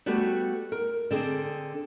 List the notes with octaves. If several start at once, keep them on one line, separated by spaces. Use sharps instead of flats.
G3 A3 B3 F#4 G4
A#4
D3 C4 G#4